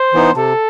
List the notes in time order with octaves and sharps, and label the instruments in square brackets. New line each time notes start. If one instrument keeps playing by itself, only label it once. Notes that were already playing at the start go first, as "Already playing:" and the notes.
Already playing: [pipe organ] C5
[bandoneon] E3 B3 D#4
[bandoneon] C3 [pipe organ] A4